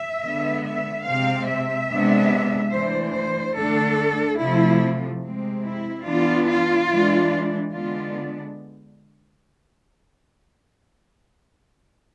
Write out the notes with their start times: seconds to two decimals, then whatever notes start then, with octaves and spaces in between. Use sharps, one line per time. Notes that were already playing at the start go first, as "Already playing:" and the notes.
Already playing: E5
0.24 D3 G#3 B3
0.64 E5
1.06 C3 G#3 C4 F5
1.47 E5
1.89 C3 G#3 B3 D4
2.73 E3 A3 D4 C5
3.15 C5
3.56 D3 A3 D4 A4
4.39 C3 F3 A3 E4
5.22 C3 G#3 C4
5.64 E4
6.05 E3 B3 D4 F4
6.48 F4
6.89 E3 G#3 D4
7.72 D3 G#3 B3 D4 F4